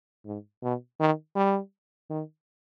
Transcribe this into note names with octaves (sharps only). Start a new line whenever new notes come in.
G#2
B2
D#3
G3
D#3